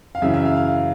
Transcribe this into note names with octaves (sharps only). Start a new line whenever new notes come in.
F5
F#2 C#3 E3 E5
E5
F5
F5
F5